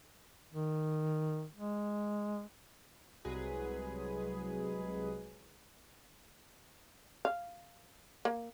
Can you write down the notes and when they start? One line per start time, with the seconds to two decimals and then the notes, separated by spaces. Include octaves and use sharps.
0.53 D#3
1.56 G#3
3.25 C2 F#3 G#3 G#4 B4
7.25 F5
8.25 A#3